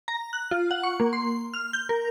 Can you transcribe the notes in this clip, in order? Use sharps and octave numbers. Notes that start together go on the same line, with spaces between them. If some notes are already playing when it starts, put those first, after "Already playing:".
A#5
F#6
F4
F#5
C#6
A#3
C6
F6
G6
A#4